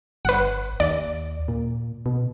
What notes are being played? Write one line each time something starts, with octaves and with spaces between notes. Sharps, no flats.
G1 B4 F#5
D#2 D5
A#2
B2